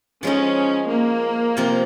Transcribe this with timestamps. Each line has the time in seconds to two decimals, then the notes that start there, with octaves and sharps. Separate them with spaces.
0.23 F3 G#3 C#4 D#4
0.89 A#3
1.57 C3 F3 C4 F4